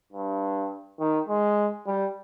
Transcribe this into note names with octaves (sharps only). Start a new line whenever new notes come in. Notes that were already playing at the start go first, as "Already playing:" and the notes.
G2
D#3
G#3
G3